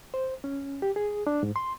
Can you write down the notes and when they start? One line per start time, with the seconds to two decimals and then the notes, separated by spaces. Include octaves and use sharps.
0.14 C5
0.44 C#4
0.82 G4
0.96 G#4
1.27 D4
1.43 G#2
1.56 C6